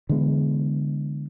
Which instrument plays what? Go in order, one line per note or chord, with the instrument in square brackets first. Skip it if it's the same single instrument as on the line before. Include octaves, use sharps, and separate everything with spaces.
[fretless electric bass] D3 E3 G#3 B3